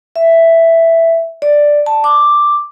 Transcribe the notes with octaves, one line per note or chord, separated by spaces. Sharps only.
E5
D5
A5
D6